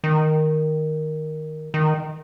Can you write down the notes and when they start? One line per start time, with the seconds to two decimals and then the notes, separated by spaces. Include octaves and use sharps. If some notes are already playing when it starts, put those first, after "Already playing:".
0.04 D#3
1.74 D#3